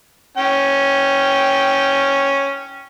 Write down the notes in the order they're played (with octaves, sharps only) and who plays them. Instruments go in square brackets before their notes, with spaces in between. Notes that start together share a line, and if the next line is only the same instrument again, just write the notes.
[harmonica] C#4 G5